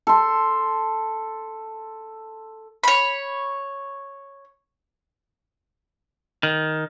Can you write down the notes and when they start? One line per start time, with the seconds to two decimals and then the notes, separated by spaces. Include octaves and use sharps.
0.07 A4 C6
2.84 C#5 B5
6.43 D#3